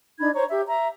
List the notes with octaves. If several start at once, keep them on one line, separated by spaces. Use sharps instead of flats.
D4 D#4 B5 G#6
C5 C#5 A#5 C#6
G4 E5
E5 A#5